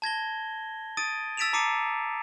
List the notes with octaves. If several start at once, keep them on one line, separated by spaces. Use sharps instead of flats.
A5 G#6 A#6 G7
D#6 A6 D7 D#7
E6 A6 B6 D7 E7 F7
A5 A#5 D6 C7 C#7 D#7